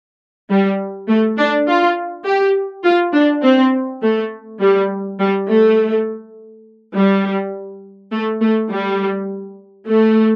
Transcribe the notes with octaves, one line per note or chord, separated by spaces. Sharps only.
G3
A3
D4
F4
G4
F4
D4
C4
A3
G3
G3
A3
G3
A3
A3
G3
A3